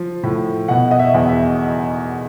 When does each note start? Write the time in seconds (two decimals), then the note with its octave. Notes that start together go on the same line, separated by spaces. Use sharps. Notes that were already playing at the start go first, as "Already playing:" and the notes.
Already playing: F3
0.23 A2
0.68 B2 F#5
0.91 D#5
0.99 E5
1.14 E2
1.29 E5